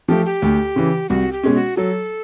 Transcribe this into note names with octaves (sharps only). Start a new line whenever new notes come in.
F3 A3 G4
G4
D2
C#3 E3
C2 F#4
G4
B2 G#3 C#4
F#4
F#3 A4